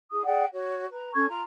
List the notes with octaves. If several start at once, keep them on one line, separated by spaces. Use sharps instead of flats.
E4 G#4 D#6
G#4 D5 F#5 G5
F#4 C#5
B4 A#5
C#4 A4 C#6 G#6
F4 A#5